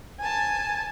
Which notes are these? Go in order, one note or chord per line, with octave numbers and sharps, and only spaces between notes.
G#5 A5